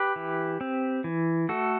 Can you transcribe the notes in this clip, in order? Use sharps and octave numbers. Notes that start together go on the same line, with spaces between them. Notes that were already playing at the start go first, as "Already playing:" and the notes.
Already playing: G4 B4
E3
C4
E3
A3 F#4 A4